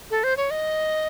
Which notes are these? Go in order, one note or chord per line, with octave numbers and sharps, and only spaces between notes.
A4
C5
C#5
D#5